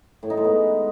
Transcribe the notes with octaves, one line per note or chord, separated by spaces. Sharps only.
A2
D#4
G#3
B3